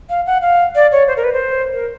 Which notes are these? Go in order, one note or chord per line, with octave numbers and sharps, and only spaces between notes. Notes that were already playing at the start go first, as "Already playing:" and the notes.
F5
F#5
F5
D5
C#5
C5
A#4
B4
C5
A#4